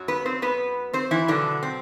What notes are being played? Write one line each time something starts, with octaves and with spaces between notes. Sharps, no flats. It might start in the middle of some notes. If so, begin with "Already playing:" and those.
Already playing: F#2 F#3
B3 B4
C4 C5
B3 B4
C4 C5
E3 E4
B2 D3 F#3 B3 D4
C4